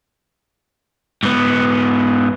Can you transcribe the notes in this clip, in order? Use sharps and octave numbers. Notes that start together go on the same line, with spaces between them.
G#2 B3